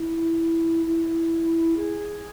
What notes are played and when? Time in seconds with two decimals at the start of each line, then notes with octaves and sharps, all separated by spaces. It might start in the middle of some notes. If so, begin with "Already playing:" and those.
Already playing: E4
0.85 E4
1.76 G#4